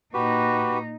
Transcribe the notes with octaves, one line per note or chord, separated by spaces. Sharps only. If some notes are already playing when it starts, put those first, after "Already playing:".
A#2 D#4 F#4 G4 B4